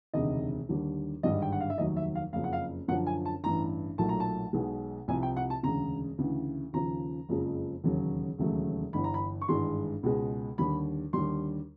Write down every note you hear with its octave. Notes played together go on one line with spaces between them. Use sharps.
E1 D2 C3 D#3 D#5
D#2 D3 G3
G#1 G2 D3 G3 D#5
G5
F#5
F5
E5
F1 D#2 D#3 F#3 D#5
E5
F5
F#1 F2 C#3 F5
F#5
F5
F#2 D3 F3 F#5
G#5
A5
A1 G2 E3 A#5
B1 A#2 F#3 A3 A5
A#5
A5
B1 B2 G#3
C2 C3 F3 G#5
G5
F#5
A5
E1 D2 C#3 A#5
D2 C#3 E3
D#2 C#3 F3 A#5
F#1 F2 C#3 F3 G#3
E1 D#2 C#3 F#3
E1 D#2 C#3 F#3 A3
G1 G2 E3 B5
A#5
B5
C#6
G#1 G2 E3 G#3 C6
C#2 B2 G#3
D#2 D3 G3 B5
D#2 D3 G3 C6